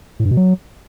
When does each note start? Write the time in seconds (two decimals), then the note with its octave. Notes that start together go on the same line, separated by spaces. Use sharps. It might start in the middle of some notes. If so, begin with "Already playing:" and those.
0.20 A2
0.25 G2
0.31 B2
0.37 F#3